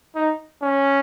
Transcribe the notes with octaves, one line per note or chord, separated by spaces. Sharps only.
D#4
C#4